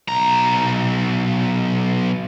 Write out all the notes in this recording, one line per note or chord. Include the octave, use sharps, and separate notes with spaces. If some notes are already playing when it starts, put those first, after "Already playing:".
B1 A#5